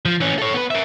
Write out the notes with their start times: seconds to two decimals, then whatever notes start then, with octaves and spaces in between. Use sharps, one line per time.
0.05 F3
0.20 E3 C#4
0.39 A4 C#5
0.54 B3 B4
0.71 A#4 E5